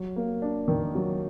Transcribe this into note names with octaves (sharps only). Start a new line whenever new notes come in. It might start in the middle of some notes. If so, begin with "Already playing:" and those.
Already playing: F#3
A#3
D4
D#3
F#3